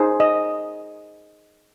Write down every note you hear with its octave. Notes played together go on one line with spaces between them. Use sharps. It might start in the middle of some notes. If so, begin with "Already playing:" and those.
Already playing: D#4 G#4 C5
D#5